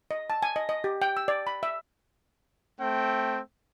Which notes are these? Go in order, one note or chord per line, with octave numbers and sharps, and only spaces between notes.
D#5
A5
G#5
D#5
D#5
G4
G5
E6
D5
B5
E5
A3 C4 G5